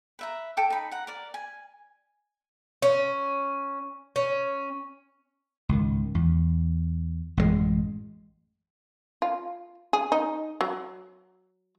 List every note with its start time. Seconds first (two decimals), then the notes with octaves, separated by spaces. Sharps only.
0.19 B4 E5 A#5
0.57 A4 G5 D6
0.70 D#4 B5
0.91 F#5 A#5
1.07 A#4 D5
1.34 G#5
2.82 C#4
4.16 C#4
5.69 C#2 G#2 D#3
6.15 E2
7.37 A1 F#2 C3 G#3
9.22 F4
9.93 G#4
10.12 D#4
10.61 F#3